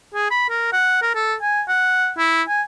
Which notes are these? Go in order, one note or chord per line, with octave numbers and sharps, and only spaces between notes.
G#4
B5
A#4
F#5
A#4
A4
G#5
F#5
E4
G#5